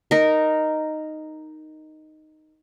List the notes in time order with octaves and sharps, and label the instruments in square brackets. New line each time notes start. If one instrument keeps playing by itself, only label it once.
[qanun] D#4 A#4